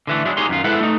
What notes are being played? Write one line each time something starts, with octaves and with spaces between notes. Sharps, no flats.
D3 E3 A3
F#3 G#3 D4 E4
D#4 G4 G#4 C#5 D#5 C6
F#2 D#3 F4
G#3 E4 A4 B4 C5 F#5
A3 D#4